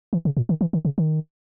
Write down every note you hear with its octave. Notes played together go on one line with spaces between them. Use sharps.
E3
C#3
A#2
D#3
E3
D#3
C#3
D#3